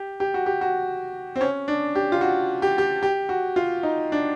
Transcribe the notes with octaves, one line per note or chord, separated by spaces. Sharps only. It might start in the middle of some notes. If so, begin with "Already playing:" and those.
Already playing: G4
G4
F#4
G4
F#4
C4
C#4
D4
G4
F4
F#4
G4
G4
G4
F#4
F4
D#4
D4